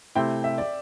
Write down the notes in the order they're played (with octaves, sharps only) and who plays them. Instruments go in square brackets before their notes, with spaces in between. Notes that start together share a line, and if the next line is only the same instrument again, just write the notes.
[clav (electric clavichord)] C3 A3 C4 E4 [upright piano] G5
[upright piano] E5
D5